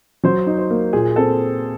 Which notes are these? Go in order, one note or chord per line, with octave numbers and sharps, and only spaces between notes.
F#3 C5
D#4
C5
A#3
A#2 G#4
C4 A4